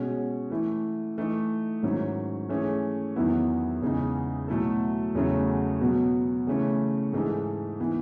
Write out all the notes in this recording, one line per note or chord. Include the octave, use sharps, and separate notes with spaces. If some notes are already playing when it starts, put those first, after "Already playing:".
Already playing: B2 G#3 C#4
E3 A3 E4
E3 A3 D#4
G#2 D#3 F#3 C#4 E4
E3 A3 C#4 G#4
E2 D#3 F#3 B3 E4
E2 C#3 G#3 D#4
B2 F#3 A3 E4 A4
E2 C#3 F#3 A3 C#4
B2 F#3 B3
C#3 E3 A3 C#4
G#2 E3 G#3 D#4 A4
E3 B3